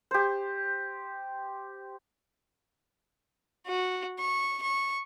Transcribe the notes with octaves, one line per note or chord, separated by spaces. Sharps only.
G4 C5
F#4
C#6
C#6